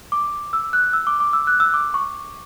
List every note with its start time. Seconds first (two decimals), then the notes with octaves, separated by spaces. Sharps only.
0.12 D6
0.53 E6
0.73 F#6
0.93 E6
1.07 D6
1.20 D6
1.33 E6
1.47 F#6
1.60 E6
1.74 D6
1.94 C#6